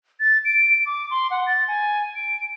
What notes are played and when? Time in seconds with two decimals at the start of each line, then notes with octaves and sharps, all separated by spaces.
0.20 A6
0.45 D7
0.86 D6
1.11 C6
1.31 F#5
1.47 A6
1.68 G#5
2.16 D7